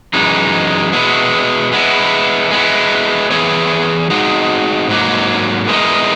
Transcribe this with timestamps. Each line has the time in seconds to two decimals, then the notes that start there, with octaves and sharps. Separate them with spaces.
0.13 F#2 E3 G#3 D#4
0.92 B2 G#3 B3 E4
1.72 G#3 B3 E4
2.51 G#3 B3 E4
3.30 E3 B3 E4 G#4 C#5
4.10 G#3 D#4 F#4
4.89 G#2 F#3 A#3
5.68 G#3 B3 E4 A#4 D#5